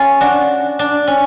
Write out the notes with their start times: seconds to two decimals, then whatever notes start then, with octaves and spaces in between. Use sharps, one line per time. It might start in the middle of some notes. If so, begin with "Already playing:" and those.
Already playing: C#4 F4 G#4
0.21 D4 F#4
0.79 D4
1.08 C#4